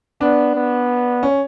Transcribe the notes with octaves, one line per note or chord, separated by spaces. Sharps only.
B3 D4
B3
C#4